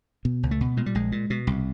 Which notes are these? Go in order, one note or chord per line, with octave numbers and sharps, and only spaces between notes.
B2
C#2
A3
B2
A#2 G#3
G3
A#1 G#3
A#2
B2
C2